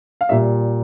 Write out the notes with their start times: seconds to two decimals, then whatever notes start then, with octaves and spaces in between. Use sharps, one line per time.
0.21 F5
0.29 A#2 G3 E5